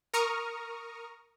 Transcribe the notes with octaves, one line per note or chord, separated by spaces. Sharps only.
A#4 A#5 C#6 D#6 F6